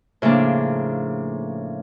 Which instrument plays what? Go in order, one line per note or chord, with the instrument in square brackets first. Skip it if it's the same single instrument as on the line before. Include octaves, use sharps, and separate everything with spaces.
[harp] A2 C#3 F3 A#3 D4